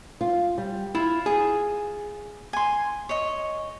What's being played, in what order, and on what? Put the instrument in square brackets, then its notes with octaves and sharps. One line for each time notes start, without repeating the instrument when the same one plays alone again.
[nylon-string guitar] F4
G3
[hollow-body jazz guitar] E4 [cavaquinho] F4
[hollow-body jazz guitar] G#4
[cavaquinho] G#5 C6
C#5 D#5